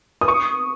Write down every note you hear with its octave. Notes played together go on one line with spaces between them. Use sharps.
D#6
C#6